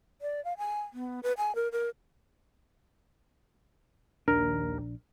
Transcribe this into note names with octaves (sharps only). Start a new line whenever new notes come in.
D5
F5
G#5
B3
B4
G#5
A#4
A#4
A#1 D#2 D4 A#4